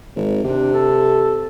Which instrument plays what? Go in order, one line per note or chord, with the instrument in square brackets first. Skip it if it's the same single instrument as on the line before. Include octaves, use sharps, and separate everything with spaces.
[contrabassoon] G#1
[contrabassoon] C3 [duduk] D4
[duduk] A4